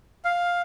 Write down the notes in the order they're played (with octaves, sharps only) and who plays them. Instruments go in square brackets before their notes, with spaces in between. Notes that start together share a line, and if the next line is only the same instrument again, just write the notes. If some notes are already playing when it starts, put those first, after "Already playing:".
[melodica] F5